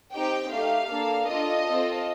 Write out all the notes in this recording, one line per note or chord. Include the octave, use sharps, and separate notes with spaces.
C4 D#4 G4 G5
A3 D#4 G4 F5
A#3 D4 A4
D4 F4 A4 D#5
C4 F4 A4